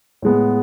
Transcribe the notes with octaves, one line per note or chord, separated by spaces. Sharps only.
A2 G#3 B3